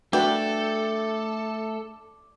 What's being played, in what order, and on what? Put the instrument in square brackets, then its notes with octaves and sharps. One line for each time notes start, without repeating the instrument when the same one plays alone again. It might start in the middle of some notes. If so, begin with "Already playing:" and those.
[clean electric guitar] A3 [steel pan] D4 F#4 B4 [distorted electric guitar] A4 [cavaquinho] D5 G5